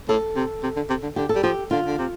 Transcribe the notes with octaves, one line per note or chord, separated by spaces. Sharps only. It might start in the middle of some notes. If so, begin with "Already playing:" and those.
A2 A4
C3
C3
D3
C3
D3
D3 G4
A4
G3
F3 G4
D3 F4
D3
C3